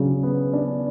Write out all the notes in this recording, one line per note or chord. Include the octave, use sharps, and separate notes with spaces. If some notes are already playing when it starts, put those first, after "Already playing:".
Already playing: C#3 F#3 D4
B3
D4